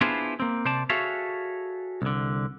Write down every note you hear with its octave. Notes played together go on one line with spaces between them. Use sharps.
B3 D4 E4 F4 G#4 C5
A#3 C4
C3 C5 D5 A5
F#4 G#4 A4 C#5 E5 F5
C2 D3